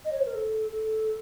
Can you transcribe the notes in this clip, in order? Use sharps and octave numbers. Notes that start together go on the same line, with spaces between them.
D#5
C#5
C5
A#4
A4
A4